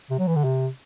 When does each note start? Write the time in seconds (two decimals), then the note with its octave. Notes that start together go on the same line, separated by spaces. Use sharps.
0.11 C3
0.19 F#3
0.27 E3
0.36 D3
0.44 C3